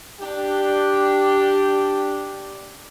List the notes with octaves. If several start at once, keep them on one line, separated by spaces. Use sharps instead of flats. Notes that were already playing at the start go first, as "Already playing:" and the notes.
D4 G4